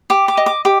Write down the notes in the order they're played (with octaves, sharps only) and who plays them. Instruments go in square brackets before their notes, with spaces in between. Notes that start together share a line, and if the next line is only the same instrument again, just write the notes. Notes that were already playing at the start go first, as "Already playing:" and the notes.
[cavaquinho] G4 D6
D6
D#5
D6
G4 D6